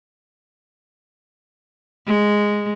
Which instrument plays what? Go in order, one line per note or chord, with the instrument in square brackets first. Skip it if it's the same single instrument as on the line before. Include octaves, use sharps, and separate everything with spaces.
[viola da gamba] G#3